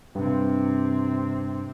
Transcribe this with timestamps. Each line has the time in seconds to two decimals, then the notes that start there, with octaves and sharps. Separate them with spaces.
0.15 G2 C3 C4